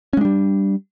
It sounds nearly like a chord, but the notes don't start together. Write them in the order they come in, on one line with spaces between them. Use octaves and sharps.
C#4 G#3 D4 G3